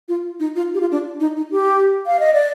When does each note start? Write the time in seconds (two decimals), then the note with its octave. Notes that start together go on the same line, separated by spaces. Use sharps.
0.08 F4
0.40 D#4
0.56 F4
0.74 G4
0.80 F4
0.92 D4
1.20 D#4
1.36 D#4
1.51 G4
2.07 F5
2.20 D#5
2.34 D5